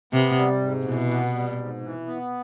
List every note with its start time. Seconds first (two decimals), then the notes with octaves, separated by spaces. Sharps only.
0.13 C3 B3
0.37 G3
0.61 G#2
0.85 B2 E3
1.10 B3
1.34 G3
1.58 G#2
1.82 E3
2.06 B3